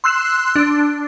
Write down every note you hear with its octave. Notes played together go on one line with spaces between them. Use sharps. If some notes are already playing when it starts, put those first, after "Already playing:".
C6 E6 F#6 C7 E7
D4